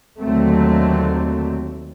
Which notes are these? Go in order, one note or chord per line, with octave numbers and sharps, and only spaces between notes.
D#2 D3 F#3 A3 C4